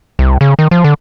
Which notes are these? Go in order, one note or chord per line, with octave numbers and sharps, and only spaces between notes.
C2
C#3
D#3
F3
D3